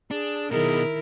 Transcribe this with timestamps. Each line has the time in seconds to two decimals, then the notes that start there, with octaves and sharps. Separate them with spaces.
0.11 D4 G#4
0.51 B2 D#3 D#4 E4 G#4 A#4